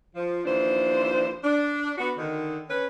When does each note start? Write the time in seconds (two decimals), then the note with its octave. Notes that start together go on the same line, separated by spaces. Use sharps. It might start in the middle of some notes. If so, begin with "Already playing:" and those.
0.15 F3
0.45 D#2 E3 F3 D4 C5
1.44 D4
1.98 B3 F#4
2.17 D3 D#3
2.69 C#4 B4